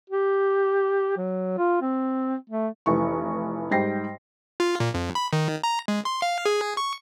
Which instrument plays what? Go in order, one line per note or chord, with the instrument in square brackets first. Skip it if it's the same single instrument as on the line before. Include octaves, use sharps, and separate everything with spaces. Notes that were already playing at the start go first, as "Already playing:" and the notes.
[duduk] G4
F#3
F4
C4
A3
[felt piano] F1 E3 C#6
G#2 G3 G5 A#6 C7
[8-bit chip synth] F4
A#2
F2
B5
D#3
A#5
G#3
C6
F5
G#4
C#6